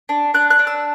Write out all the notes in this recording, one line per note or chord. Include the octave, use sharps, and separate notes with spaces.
D4
D4 F#6
F#6
D4
E6